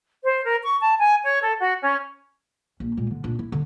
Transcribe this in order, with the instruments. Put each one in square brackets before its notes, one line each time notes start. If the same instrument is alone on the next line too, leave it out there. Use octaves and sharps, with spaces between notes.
[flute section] C5
A#4
C#6
A5
G#5
C#5
A4
F#4
C#4
[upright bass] A#1
A#2 G#3
D3
A#2 D4
E4
D3